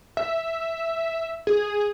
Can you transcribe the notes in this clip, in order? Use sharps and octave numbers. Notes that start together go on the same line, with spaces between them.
E5
G#4